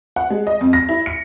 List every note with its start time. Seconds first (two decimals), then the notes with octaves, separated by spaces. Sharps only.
0.16 F#5
0.30 G#3
0.47 D#5
0.61 F2
0.73 A#6
0.89 E4
1.06 C#7